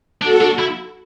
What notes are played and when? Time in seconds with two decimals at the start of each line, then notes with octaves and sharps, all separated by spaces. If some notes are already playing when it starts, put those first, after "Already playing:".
0.22 D4 F#4 A4
0.41 D4
0.59 E4